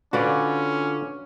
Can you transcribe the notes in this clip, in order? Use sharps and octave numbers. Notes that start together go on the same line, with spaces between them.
D3 C#4 F4 F#4 B4 D5